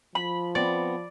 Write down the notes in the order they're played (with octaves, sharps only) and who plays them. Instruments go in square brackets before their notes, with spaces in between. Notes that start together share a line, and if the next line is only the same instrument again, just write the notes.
[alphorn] F3 [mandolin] B5
[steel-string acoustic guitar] B3 C4 [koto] D5